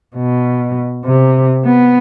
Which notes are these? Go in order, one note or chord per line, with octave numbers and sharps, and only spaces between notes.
B2
C3
B3